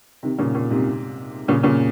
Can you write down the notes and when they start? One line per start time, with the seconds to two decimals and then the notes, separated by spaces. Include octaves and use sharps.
0.23 C3 D#3
0.39 A#2 C#3
0.55 A#2
0.70 G#2 C3
1.48 A#2 C#3
1.63 A#2 C#3